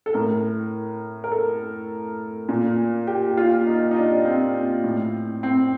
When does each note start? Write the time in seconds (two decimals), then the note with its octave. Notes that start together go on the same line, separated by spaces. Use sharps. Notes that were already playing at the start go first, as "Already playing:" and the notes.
0.06 A4
0.14 A2 A#4
1.24 A#4
1.32 A4
2.49 A#2
3.07 G4
3.37 F4
3.67 D#4
3.91 D#4
3.96 D4
4.25 C4
4.84 A2
5.43 C4